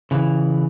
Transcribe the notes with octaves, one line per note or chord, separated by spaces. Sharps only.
C#3 E3